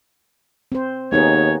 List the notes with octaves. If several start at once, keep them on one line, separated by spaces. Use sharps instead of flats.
C4 C5
D#2 B3 D#4 G#4 C#5